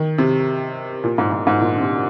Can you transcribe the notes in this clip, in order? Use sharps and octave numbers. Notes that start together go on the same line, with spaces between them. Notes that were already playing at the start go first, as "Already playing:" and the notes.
Already playing: D#3
C3
A#2
G#2
G#2
G#2
A#2
D3
C3